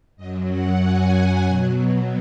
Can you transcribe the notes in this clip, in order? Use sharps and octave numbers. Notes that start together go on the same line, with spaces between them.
F#2 F#3 D#5
F#5
G#5
F#5
B2 F#3